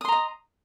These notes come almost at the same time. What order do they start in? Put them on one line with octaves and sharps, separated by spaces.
D#6 C6 A#5 D#5